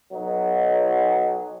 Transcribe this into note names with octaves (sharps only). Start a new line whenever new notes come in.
B1 F#3 D#4